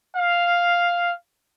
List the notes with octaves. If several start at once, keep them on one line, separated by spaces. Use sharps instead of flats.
F5